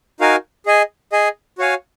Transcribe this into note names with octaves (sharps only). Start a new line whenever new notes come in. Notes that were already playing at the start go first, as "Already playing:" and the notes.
D#4 F#4 A#4 F5 G#5
G#4 D#5 G#5
G#4 D#5 G#5
F#4 C#5 F5 G#5